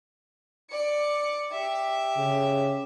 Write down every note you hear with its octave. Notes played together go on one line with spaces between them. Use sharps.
D5 C#7
G4 E5
C#3